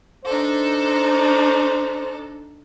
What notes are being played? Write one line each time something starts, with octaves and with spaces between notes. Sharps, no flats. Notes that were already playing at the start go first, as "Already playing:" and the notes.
D4 D#4 A4 C5